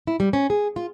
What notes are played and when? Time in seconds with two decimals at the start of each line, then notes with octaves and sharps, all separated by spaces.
0.07 E4
0.20 G3
0.33 C#4
0.50 G#4
0.76 F4